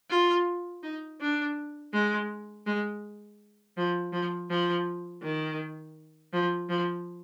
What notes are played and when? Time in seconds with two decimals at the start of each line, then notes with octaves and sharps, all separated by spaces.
0.10 F4
0.83 D#4
1.21 D4
1.93 G#3
2.66 G#3
3.77 F3
4.13 F3
4.50 F3
5.23 D#3
6.33 F3
6.69 F3